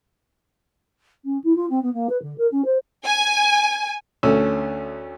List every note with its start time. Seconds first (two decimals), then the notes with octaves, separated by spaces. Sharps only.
1.24 C#4
1.43 E4
1.55 F4
1.69 C4
1.82 B3
1.93 A#3
2.09 B4
2.22 D3
2.38 A#4
2.51 C#4
2.64 C5
3.06 G#5
4.23 D2 A3 C#4 E6